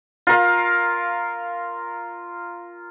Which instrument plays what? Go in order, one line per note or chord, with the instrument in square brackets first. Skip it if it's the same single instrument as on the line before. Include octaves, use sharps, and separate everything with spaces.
[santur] F4 A#4 F5